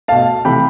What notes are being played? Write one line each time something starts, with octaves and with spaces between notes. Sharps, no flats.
B2 A3 F5 A5
C3 E3 A3 G5 B5